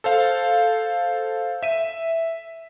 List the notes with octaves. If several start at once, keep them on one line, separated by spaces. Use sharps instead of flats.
A4 C5 F5
E5 D#7